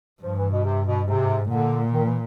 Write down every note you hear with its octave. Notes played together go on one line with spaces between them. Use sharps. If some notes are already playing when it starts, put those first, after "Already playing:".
G2 F3
E3
B2
C3
B2
G#2 C3
A#2 D3
D#3
E3